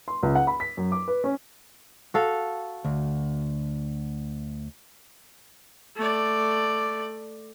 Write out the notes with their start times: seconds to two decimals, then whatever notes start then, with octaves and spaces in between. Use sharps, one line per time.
0.08 C6
0.23 C#2
0.35 F#5
0.47 B5
0.60 B6
0.77 F#2
0.92 D6
1.08 B4
1.24 C#4
2.14 F#4 A4 F5
2.85 D2
5.96 A3 D5